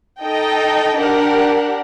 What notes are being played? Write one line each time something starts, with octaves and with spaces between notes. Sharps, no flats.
D#4 A4 D#5 G5
D4 G4 A#4 F#5